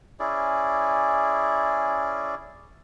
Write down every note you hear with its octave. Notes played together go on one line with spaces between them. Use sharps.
C#4 E4 G#4 D5